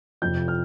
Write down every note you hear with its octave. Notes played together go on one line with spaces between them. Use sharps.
F1 F2 F3 G6
F6